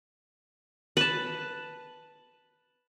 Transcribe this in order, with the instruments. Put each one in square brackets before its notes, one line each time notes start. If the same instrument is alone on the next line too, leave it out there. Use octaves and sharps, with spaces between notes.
[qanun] B4 A5